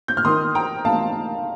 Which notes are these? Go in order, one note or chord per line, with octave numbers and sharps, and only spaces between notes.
G6
F6
D#3 A#3 D#4 C6 D#6
G5 A#5
F5 A5